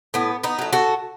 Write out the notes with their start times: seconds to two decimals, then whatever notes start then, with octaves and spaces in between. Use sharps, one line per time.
0.14 A2 B3
0.43 B3 D#4
0.59 F#3 A3
0.73 F#4 A4